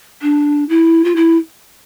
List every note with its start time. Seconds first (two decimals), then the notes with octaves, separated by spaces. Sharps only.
0.22 D4
0.69 E4
1.04 F4
1.16 E4